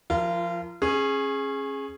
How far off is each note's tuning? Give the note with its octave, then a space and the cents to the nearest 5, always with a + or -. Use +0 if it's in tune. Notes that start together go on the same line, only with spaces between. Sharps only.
F3 +0 F4 -35 A#4 +0
C#4 -25 G#4 +0